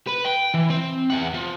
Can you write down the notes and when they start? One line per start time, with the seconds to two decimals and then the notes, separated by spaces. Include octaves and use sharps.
0.09 B4
0.26 G5
0.54 E3
0.70 C4
1.10 E2 F#5
1.34 F3